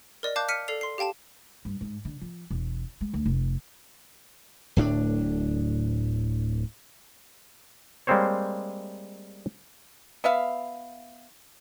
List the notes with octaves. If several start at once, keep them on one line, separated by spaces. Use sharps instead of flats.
A#4 D5 D#5
F5 A5 D6 F#6 G6
F6 B6 C#7 D#7
A4 D5 C7 F7
C6 C7
G4 F5 G5 A5 E7
G2
G#2
D3
F3
E1
G#3
D2
F1
D1 A2 C#4 D4
G3 G#3 A#3 C4 C5 C#5
B3 E5 F5